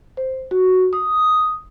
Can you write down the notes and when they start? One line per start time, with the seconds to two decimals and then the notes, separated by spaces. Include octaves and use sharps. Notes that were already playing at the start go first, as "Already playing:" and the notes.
0.17 C5
0.51 F#4
0.93 D#6